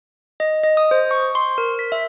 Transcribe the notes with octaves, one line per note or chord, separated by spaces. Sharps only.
D#5
D#5
D#6
C5
C#6
C6
A#4
B6
E5